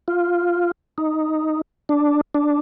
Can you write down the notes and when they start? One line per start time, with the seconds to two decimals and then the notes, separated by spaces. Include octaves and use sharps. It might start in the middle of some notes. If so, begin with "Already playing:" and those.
0.08 F4
0.98 D#4
1.89 D4
2.35 D4